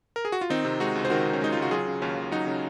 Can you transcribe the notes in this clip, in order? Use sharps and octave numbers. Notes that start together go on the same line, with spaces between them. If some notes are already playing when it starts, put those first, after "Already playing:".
A#4
G#4
F#4
F4
D#3 C4 D#4
C3
G#3 D#4 F#4
C#2
C5
D#3 F#4 A#4
C3
C#4
G#3 D#4
C#2 F4
F#4
F#3 F4 G#4
C#3
D#2 C#4 F4
D#2
F#3 D#4 F#4
C#3